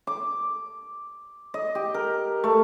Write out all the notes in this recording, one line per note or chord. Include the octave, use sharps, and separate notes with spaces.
D6
D#5
G4
A#4
A3